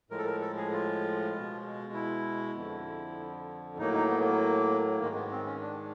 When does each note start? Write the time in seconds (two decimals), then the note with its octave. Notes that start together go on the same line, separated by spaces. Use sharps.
0.10 A2 F3 G#3 A#4
0.18 A4
0.26 A#4
0.41 A4
0.57 G#4
0.72 F4
1.33 B2 G#3
1.94 E4
2.56 F2 D3 F3
3.78 A2 F#3 A#3 D#4
3.93 D#4
4.09 B3
4.19 B3
4.24 A#3
5.00 G#2 D#3 G#3 A#3
5.15 B3
5.31 C4
5.46 C#4
5.61 D4